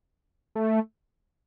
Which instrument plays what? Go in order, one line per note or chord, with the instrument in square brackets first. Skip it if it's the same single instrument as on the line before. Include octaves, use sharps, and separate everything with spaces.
[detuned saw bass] A3